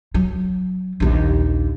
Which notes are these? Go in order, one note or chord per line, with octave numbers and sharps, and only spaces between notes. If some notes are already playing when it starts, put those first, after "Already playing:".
F#3
A#1 D#2